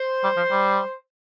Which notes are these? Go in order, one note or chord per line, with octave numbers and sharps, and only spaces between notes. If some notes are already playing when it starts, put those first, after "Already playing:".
Already playing: C5
G3
F3
G3